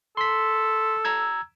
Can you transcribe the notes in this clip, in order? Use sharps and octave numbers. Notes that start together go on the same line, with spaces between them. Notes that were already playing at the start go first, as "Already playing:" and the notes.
A4 C6 B6
A#5 E6 G#6